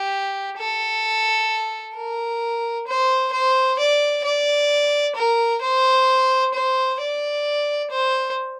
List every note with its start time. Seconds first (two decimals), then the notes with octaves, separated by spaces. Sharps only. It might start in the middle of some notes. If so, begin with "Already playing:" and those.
Already playing: G4
0.58 A4
1.95 A#4
2.87 C5
3.33 C5
3.78 D5
4.24 D5
5.15 A#4
5.61 C5
6.54 C5
7.00 D5
7.90 C5